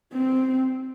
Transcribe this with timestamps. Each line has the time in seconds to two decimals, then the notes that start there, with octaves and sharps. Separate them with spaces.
0.13 C4